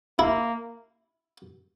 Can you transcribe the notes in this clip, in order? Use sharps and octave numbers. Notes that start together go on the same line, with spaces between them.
A#3 E4